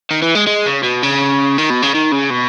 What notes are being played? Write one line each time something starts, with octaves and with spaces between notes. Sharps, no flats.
D#3
E3
G#3
G#3
C#3
B2
C#3
D#3
B2
C#3
D#3
C#3
B2